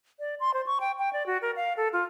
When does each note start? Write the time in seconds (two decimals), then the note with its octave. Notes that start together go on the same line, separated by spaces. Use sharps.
0.20 D5
0.40 C6
0.54 C5
0.66 C#6
0.80 G5
0.99 G5
1.13 D5
1.26 F#4
1.42 A#4
1.56 F5
1.77 A4
1.93 F4